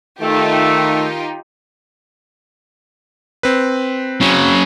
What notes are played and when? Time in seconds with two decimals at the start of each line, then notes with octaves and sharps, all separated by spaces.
0.21 D#3 A3 D#4 F4 G4
3.43 C4 B4
4.21 C#3 F#3